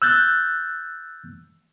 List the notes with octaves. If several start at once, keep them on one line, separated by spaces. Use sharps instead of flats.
E6 F#6 G6 A6